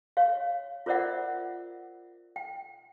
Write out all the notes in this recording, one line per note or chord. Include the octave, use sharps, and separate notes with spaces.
C#5 F5
F4 A#4 C5 D5 E5 F#5
G5